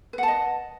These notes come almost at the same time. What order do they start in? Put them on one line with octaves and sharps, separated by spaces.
B4 F#5 A5 D#5